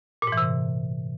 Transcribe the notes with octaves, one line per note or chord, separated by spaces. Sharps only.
A#2
G#2
E3
C3